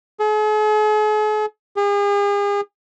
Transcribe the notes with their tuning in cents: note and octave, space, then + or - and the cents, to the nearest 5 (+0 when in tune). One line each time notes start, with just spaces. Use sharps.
G#4 +45
G#4 -40